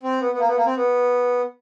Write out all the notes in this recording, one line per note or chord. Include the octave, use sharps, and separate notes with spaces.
C4
B3
B3
A#3
B3
A#3
C4
B3